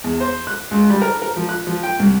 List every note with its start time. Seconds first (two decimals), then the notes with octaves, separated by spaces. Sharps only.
0.04 E2
0.20 C5
0.47 F#6
0.71 C#2
0.90 G3
1.02 A#4
1.22 A#4
1.36 F3
1.49 F#6
1.67 F3
1.83 G5
1.99 C2